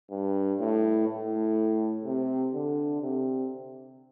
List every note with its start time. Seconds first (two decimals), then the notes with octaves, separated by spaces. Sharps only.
0.11 G2
0.60 A2
1.08 A2
2.05 C3
2.54 D3
3.02 C3